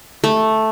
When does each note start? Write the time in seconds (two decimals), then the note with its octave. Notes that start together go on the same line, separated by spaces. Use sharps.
0.24 A3